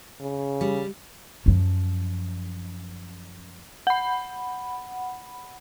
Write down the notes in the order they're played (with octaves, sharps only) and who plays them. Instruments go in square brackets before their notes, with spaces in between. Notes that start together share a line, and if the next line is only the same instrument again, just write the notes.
[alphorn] C#3
[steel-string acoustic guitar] G3
[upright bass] F#2 F3
[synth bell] F#5 B5